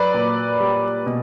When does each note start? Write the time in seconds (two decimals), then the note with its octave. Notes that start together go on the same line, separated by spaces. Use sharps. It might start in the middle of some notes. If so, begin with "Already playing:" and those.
Already playing: F#3 B4 D5
0.14 A#2
0.61 G3
1.06 B2